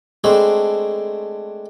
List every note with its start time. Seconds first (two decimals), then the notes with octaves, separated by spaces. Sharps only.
0.24 G#3 A3 C4 D4 E4